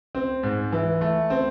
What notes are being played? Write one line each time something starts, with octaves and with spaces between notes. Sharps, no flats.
C4
G#2
E3
A3
C4